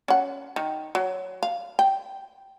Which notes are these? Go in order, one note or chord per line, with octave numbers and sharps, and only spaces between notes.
C#4 F#5
D#3
F#3
F5
G5